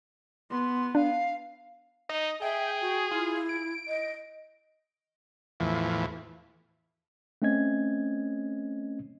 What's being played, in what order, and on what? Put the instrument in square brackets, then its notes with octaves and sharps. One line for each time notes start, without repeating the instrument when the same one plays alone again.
[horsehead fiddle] B3 [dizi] C6
[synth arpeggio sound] D4 [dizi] F5
[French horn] D#4 [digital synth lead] D#5
[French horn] G#4 [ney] E5 [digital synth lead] G5
[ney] F#4
[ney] E4 [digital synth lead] F4
[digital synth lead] D7
[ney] D#5
[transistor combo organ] E2 A2 E3 F3
[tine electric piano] A3 C4 C#4 D#5 G#6